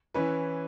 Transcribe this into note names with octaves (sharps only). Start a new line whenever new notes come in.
E3 C#4 E4 B4